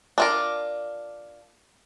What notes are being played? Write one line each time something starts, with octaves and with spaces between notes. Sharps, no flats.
D4 F4 A#4